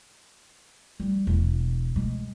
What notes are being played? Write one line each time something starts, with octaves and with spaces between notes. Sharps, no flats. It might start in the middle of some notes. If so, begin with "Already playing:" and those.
G3
E1
G#3